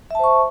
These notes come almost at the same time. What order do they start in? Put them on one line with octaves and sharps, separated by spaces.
E5 A5 C5 C#6